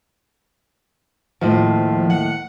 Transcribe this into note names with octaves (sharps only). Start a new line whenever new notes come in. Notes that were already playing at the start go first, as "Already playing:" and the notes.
D#2 A2 F3 C5
F#5